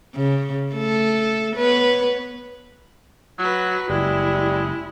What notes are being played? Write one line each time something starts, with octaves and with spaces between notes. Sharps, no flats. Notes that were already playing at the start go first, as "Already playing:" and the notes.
C#3
A3 A4
B3 B4 C#5
F#3 F#4 B4
F#1 G3 G#3 E4